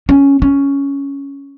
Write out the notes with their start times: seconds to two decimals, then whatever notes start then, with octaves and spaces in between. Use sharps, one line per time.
0.09 C#4
0.42 C#4